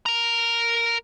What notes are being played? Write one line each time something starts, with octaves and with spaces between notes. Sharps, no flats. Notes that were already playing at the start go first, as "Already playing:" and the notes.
A#4 A#5